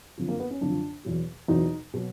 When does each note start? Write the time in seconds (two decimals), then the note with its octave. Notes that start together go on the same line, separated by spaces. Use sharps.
0.18 F#2 D3 F3
0.28 A#3
0.40 B3
0.50 C#4
0.61 F#2 D3 F3 D4
1.05 E2 B2 F#3
1.48 E2 B2 F#3 D#4
1.94 B2 F#3